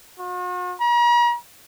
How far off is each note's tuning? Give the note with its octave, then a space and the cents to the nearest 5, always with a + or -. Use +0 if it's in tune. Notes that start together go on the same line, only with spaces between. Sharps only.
F#4 -45
A#5 +40